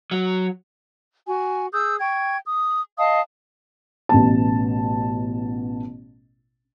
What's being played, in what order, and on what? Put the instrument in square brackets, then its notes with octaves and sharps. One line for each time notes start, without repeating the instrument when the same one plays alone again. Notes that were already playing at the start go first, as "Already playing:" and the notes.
[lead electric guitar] F#3
[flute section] F#4 G#5
G#4 D#6 E6 G6
G5 C#6 G#6
D#6
D#5 F5 A5 D#6
[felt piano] A1 B2 A5